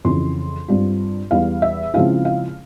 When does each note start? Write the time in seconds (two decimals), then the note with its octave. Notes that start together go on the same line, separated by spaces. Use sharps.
0.04 F2 C#3 E3 C6
0.68 G2 G3 C4 F4
1.31 E2 E3 G3 F5
1.62 E5
1.94 C#3 F3 G#3 C4 E4 F5
2.25 F5